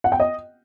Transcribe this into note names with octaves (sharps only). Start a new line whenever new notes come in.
F#5
G5
D#5